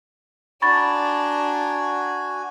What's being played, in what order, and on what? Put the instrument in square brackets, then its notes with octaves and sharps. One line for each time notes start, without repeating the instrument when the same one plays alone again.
[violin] D4 A#5 [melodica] F#4 G#5 [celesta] B5 C#6 A6